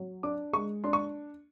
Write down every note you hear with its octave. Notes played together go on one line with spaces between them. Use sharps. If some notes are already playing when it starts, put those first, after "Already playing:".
Already playing: F#3
D4 D6
G#3 C#6
D4 C6
C#6